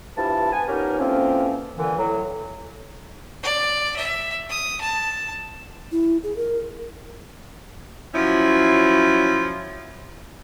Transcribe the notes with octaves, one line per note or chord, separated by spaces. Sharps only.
G2 E3 F3 E4 A5
B3 G#5
A#2 B3 C#4 D#4 G4 A#4
D3 E3 F3 A#3 C4 C#4
A#2 D3 E3
A2 F#3
D5
E5
D#6
A5
E4
G#4
A#4
F3 F#3 C#4 E4